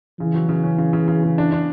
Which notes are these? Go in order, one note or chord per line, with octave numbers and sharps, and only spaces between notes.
C#3 E3
F#3
C#3
C#4
C#3
C#3
C#3
C#3
D4
D4